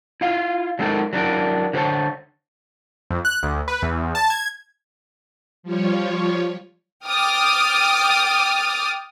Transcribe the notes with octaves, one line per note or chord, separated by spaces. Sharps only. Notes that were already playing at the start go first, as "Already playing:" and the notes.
E4 F4 F5
F#3 G#3 C4 D#4 A4 A#4
F#3 D4 E4 A#4
D3 G4 C5 C#5 A5
F2
F#6
D2
B4
E2
A5
G#6
F3 G3 F4 C#5
G5 D6 D#6 F6 A6